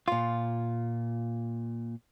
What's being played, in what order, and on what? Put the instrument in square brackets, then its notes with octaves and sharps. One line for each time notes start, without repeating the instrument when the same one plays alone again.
[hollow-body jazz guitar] A#2 F4